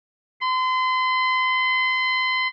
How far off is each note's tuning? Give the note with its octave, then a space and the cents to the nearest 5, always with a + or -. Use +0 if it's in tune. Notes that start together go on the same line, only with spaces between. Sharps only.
C6 -35